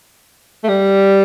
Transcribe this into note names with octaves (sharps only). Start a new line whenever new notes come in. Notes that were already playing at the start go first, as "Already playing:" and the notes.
A3
G3